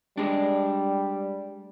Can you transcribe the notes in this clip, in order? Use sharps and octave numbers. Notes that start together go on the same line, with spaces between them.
G3 G#3 D4